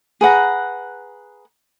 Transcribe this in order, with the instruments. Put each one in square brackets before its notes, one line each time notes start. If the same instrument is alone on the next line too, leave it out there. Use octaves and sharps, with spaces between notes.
[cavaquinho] G#4 B4 F#5 A#5